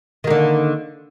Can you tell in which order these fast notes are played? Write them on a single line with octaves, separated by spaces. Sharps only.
D#3 A#3 D3